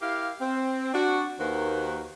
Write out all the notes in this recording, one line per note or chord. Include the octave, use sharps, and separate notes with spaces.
E4 G4 A#4 F5
C4
D4 F#4
D#2 D#3 A#3 F#4 B4 C5